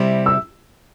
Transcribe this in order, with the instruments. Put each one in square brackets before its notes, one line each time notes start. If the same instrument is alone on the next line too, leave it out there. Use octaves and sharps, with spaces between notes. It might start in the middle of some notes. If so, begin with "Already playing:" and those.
Already playing: [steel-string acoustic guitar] C3 G3 C4 E4
[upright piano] E6